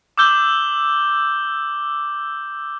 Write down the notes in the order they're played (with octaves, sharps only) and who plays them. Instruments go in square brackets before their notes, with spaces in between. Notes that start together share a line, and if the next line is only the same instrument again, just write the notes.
[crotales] D6 E6 G6 G7